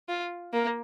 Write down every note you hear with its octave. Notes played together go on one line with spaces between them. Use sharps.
F4
A#3